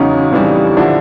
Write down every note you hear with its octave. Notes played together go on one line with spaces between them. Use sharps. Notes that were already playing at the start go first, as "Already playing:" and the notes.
Already playing: E2 C#3 F#3 C#4 D#4
F2 C#3 E3 G3
D3 F3 D4 E4